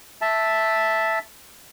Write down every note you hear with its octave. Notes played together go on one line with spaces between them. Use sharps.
E5 A5